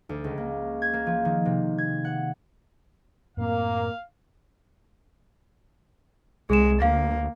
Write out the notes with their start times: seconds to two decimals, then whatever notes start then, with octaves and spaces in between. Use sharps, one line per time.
0.09 D2
0.24 C#2
0.38 A#3
0.82 G#6
0.93 A#3
1.06 F3
1.25 D#3
1.45 C3
1.78 G#6
2.05 F#5
3.37 F#2 A2 A#3 C4 F5
6.50 C2 G#3 G#4 E7
6.82 D2 A#3 F5